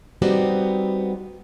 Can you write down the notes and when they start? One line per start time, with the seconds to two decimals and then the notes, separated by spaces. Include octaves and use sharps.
0.22 G3 B3 C4 D#4 F#4 G4